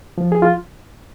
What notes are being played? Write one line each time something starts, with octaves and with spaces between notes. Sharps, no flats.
F3
G#4
F4